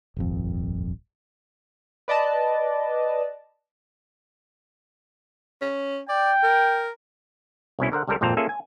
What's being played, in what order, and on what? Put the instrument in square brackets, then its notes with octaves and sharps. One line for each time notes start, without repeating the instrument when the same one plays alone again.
[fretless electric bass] D#1 G#1 F2
[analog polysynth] B4 D5 D#5 A5
[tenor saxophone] C#4
[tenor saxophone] D5 [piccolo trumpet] G5
[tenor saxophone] A#4
[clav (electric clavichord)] C2 B2 C#4 E4
D3 A#4 C5 F#5
C#2 G3 A4 A#4 C5
G#1 F2 A#2 C4 A5 A#5
A#3 C#4 F4 G#4 A4 E5
G#5